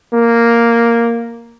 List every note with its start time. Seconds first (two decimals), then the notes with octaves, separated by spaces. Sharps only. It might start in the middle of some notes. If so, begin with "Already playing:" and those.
0.13 A#3